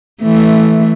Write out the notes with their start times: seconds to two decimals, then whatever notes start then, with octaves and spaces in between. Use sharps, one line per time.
0.22 E3 A3